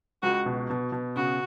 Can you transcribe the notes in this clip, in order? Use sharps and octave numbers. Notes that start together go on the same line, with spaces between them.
C#2 F#4
B2
B2
B2
C#3 F#4